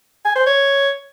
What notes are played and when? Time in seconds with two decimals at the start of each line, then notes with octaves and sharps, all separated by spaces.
0.25 G#5
0.36 C5
0.46 C#5